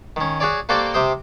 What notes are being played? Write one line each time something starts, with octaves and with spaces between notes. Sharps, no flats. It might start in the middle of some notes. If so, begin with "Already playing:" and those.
D#3 C#4
F#4 G#4 C#5 D5
A#3 F#4 G4 A4 C5 D5
C3 G4 C5 D#6